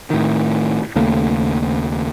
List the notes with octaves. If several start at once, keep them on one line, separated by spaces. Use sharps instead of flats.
A2 D#3
D#2 C#3 A3 A#3